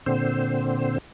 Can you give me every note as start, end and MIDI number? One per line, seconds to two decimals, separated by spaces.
0.06 0.98 46
0.06 0.98 50
0.06 0.98 60
0.06 0.98 72